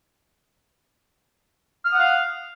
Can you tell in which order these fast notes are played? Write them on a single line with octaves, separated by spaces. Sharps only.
F6 D#6 F#5 F5